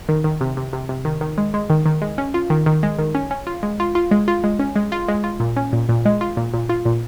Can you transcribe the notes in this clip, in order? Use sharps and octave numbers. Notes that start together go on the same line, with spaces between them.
D#3
D#3
C3
C3
C3
C3
D#3
D#3
G#3
G#3
D#3
D#3
G#3
C#4
F4
D#3
D#3
G#3
D#3
C#4
C#4
F4
G#3
F4
F4
G#3
F4
G#3
C#4
G#3
F4
G#3
F4
A#2
C#4
A#2
A#2
G#3
F4
A#2
A#2
F4
A#2